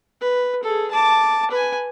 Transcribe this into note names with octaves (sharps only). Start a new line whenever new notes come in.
B4
G#4 A4
A5 D6
B4 G#5